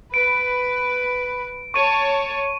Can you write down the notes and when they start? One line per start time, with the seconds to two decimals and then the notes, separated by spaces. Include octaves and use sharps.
0.14 B4 D7
1.74 C#5 A5 C#6 D#7